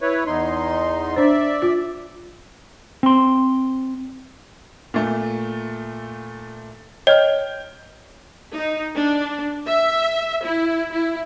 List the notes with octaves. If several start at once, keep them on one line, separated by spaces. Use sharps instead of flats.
E4 B4 C#5
E2 D#4 C6
D4 C5 D5 E5
F4
C4 C6
A#2 A3
C#5 D#5 G5 F6 G6
D#4
D4
E5
E4
E4